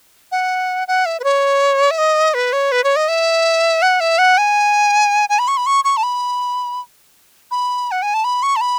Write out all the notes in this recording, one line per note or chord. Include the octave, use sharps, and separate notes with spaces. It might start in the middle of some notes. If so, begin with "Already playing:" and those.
F#5
F#5
E5
B4
C#5
E5
D#5
B4
C#5
B4
C#5
D#5
E5
F#5
E5
F#5
G#5
G#5
B5
C#6
B5
C#6
C#6
A5
B5
B5
F#5
G#5
A5
B5
C#6
A5
B5